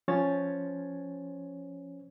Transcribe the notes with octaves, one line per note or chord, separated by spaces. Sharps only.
F3 C#4 C5 C#5 A6